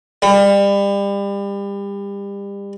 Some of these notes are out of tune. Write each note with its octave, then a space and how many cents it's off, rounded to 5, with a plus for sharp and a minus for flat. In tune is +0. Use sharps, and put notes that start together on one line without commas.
G3 +30